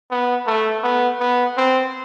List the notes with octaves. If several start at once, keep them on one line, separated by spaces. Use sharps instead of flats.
B3
A3
B3
B3
C4